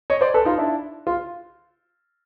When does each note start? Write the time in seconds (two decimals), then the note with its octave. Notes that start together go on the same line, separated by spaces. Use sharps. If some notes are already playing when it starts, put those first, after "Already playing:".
0.10 C#5 D#5
0.21 C5 D5
0.34 A4 B4
0.45 D#4 F4
0.58 D4 E4
1.07 F4